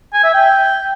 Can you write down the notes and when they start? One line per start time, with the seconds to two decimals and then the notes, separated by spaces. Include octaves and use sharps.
0.14 G#5
0.24 E5
0.34 G5